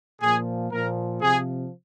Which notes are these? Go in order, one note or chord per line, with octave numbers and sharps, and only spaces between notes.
A#2 F3 G#4
A#2 F3 A#4
C3 F3 G#4